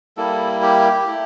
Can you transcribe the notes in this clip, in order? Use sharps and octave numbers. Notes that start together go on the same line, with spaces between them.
G3 A#3 E4 A4
G4
A3 E4